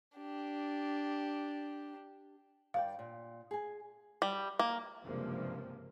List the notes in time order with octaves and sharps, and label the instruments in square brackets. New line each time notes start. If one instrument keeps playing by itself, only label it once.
[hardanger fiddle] D4 G4
[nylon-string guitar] G2 D5 G5 [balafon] F5
[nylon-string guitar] A#2
G#4 G#5
[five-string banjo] G3
A#3
[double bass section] F#1 G2 C3 F3 G#3 A#3